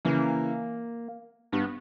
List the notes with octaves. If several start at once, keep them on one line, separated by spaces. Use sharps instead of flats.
C#3 E3 A#3
G2 B3